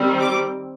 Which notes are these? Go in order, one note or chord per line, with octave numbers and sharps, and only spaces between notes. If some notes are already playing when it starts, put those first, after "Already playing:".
Already playing: D#3 G3 C4
D6